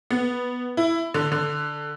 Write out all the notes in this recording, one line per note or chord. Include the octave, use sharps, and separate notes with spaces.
B3
E4
D3
D3